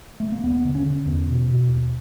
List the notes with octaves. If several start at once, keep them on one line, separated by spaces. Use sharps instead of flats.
A3
A#3
D#2 B3
D3
C#4
D3
E2
B2
B2
D#2